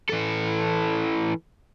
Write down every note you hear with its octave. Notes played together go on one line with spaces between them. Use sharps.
E3 A4